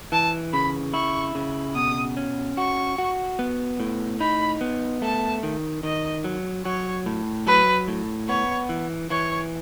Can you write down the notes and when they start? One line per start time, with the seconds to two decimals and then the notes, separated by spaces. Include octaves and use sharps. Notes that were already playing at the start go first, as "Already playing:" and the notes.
0.12 E3 A5
0.53 C#3 B5
0.94 E4 C#6
1.35 C#3
1.75 B2 D#6
2.17 C#4
2.57 F#4 C#6
2.98 F#4
3.39 B3
3.80 A2
4.20 D#4 B5
4.61 B3
5.02 A3 A5
5.43 D#3
5.83 D#3 D#5
6.24 F#3
6.65 F#3 C#5
7.06 A2
7.47 F#3 B4
7.88 A2
8.29 B3 C#5
8.69 E3
9.10 E3 C#5